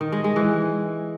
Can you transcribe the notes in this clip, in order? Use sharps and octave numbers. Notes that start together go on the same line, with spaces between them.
D#3
G#3
G#3
E3